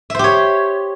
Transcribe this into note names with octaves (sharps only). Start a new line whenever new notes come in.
G4 C5 C#5 E5